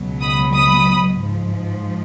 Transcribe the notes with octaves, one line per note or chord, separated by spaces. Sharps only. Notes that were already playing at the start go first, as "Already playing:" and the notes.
Already playing: C#2 B2 F#3
B5 D#6
B5 D#6
G#2 F3